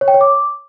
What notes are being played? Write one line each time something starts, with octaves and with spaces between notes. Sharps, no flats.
C#5
G5
C#5
D6